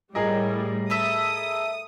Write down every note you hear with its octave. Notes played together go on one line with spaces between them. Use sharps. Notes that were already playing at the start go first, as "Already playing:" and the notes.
A2 G3 G#4 A#4 D#5
A4 B4 E5 D#6